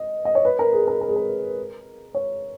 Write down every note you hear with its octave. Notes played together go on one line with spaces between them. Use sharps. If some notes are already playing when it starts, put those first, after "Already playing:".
Already playing: D#5
D#5
C#5
B4
A#4
G#4
A#4
A#4
G#4
A#4
C#5